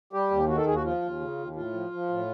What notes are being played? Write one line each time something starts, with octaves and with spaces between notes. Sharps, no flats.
G3 G4
D#2
D#3 F#4
A4
D#2 G#4
F#4
F3 F4
D#2
C#3
D#2
A2 F4
F3
F3
A2